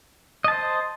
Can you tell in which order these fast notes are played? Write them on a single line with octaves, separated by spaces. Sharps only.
D#5 A5 C5